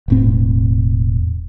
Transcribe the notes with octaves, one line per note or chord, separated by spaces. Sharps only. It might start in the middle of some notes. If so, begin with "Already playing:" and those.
E1 A2 C4